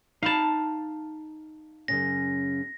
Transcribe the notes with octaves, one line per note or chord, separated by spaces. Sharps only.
D#4 F5 A5 B5
F#2 C#3 C#4 A#6